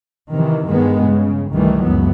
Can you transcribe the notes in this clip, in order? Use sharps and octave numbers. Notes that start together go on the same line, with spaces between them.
C3 D#3 E3
G2 D#3 G#3 B3
C#3
C2 D#3 E3 G3 A3
C#2 F#2 F#3 B3